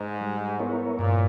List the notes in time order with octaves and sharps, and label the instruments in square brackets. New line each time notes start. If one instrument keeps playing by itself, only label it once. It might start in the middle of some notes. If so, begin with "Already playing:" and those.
Already playing: [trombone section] G#2
[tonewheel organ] G3
B3 E4 A#4 C#5
[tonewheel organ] G2 [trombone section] A#2